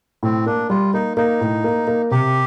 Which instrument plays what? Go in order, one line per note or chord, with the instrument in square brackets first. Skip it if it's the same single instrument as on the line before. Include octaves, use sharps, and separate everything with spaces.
[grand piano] A2 [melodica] C4
[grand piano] A#3 [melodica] D4
[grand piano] G3 [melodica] F4
[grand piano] A#3 [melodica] D#4
[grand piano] A#3 [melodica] D#4
[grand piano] A2
A#3
A#3
[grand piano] C3 [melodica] G4